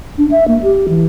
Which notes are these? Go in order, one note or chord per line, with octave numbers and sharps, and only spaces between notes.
D4
E5
A#3
G4
E3